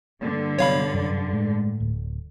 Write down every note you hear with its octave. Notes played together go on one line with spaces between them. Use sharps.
G2 D3 A#3
C3 F#3 B3 C#5 F5 B5
F#2 C3 F#3
A2 G#3
D1